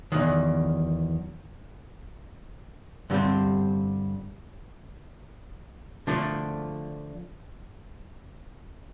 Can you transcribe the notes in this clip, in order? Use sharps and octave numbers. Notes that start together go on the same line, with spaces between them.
E2 C3 D#3 F#3
G2 D3 G3 C4
D3 F3 A3 D4